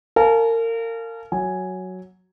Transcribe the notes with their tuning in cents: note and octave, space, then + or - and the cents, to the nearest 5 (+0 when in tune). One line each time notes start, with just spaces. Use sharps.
A#4 -30 F5 +0 G#5 +45
F#3 +0 G#5 +0